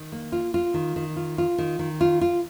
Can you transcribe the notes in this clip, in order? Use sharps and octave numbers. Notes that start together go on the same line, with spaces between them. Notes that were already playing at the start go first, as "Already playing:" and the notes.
Already playing: D#3
A#3
F4
F4
D#3
D#3
F4
F4
D#3
D#3
F4
F4